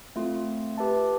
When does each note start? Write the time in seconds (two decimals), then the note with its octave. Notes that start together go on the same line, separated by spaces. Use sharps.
0.16 A3 C4 F4
0.78 G4 B4 E5 A5